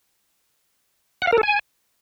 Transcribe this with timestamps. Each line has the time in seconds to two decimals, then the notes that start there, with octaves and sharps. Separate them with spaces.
1.22 F#5
1.27 F5
1.33 A#4
1.38 A4
1.43 G#5